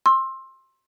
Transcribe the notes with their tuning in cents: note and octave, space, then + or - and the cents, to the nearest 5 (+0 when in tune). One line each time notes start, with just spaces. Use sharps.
C6 +20 E6 +0